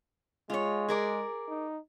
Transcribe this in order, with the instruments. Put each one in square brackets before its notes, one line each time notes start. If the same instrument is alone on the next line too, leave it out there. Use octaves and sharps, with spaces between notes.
[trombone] G#3 [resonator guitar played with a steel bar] F4 C#5
[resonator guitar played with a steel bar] G#4 A#4 D5
[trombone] D#4